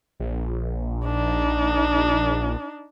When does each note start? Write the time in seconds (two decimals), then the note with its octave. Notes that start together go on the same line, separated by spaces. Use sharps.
0.20 A#1
1.05 D4 D#4